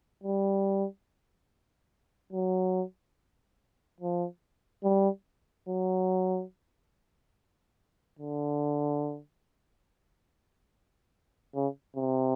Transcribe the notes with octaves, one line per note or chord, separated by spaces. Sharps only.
G3
F#3
F3
G3
F#3
D3
C#3
C3